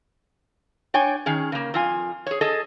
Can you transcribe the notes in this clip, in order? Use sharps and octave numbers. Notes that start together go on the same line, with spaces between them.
D4 C#5 G5 G#5
D#3 C#4 G#4
C#3 A#3
F2 F4 G#5
G#4 C#5
G#4 A4 D#5